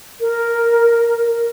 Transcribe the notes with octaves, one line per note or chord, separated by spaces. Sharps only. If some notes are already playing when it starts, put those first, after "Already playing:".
A#4